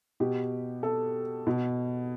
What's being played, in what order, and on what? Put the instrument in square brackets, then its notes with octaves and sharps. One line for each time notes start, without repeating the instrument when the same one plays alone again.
[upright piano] B2 G4
A4
B2